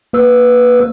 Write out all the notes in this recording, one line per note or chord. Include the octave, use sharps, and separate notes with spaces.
A#3 B4 E6